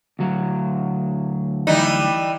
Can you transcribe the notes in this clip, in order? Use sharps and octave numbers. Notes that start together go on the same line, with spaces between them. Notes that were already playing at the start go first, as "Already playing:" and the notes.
D2 F#3
E3 G3 D#4